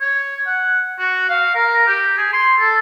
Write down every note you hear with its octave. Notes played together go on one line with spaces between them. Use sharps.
C#5
F#5
F#4
F5
A#4
G4
G#4
C6
A4